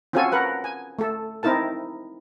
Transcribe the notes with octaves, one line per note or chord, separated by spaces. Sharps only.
C4 C#4 F4 F#4 A4 G#5
A#4 B4 F#5
G#5
A3 A4
C4 D#4 E4 A#4 A5